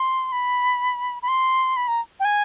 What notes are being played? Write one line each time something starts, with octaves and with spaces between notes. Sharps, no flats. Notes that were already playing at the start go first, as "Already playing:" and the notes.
Already playing: C6
B5
B5
C6
B5
A#5
G5
G#5